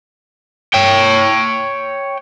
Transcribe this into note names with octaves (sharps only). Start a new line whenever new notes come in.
C#5 G5